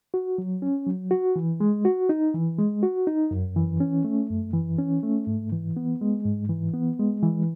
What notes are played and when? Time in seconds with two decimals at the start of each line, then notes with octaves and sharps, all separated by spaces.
0.14 F#4
0.38 F#3
0.62 C#4
0.86 F#3
1.11 F#4
1.36 E3
1.60 G#3
1.85 F#4
2.09 D#4
2.34 E3
2.58 G#3
2.83 F#4
3.07 D#4
3.31 F#2
3.57 E3
3.80 C#4
4.04 A3
4.30 F#2
4.54 E3
4.78 C#4
5.03 A3
5.27 G#2
5.52 E3
5.77 B3
6.01 G#3
6.25 G#2
6.50 E3
6.74 B3
6.99 G#3
7.23 E3